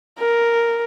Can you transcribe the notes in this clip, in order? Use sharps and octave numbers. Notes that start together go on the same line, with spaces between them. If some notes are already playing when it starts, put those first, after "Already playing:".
A#4